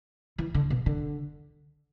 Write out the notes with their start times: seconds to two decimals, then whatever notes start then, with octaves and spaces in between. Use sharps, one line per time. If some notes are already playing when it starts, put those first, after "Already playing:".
0.38 E3
0.54 D3
0.70 B2
0.86 D3